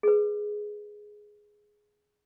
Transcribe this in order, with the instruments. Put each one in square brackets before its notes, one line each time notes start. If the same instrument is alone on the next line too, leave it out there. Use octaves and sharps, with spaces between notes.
[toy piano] G#4 B4